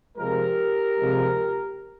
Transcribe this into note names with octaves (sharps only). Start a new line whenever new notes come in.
C3 F3 G#3 G4 A#4
C3 F3 G#3